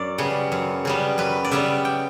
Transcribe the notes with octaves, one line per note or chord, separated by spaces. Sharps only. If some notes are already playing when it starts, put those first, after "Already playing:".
Already playing: F#2 D5
C#3 G3 B3
F#2
C#3 G3 B3
F#2 B4
D5
C#3 G3 B3 E5
G5